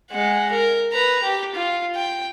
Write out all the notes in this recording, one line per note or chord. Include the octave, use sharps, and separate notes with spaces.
G#3 F#5
A#4
B4 A#5
G4
F4
G5